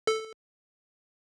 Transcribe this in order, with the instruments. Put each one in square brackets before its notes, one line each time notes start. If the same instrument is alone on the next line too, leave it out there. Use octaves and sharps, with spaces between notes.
[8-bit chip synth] A4